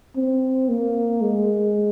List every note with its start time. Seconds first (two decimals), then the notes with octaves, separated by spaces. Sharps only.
0.16 C4
0.69 A#3
1.22 G#3